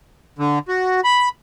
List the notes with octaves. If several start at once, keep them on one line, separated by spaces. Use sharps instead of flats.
D3
F#4
B5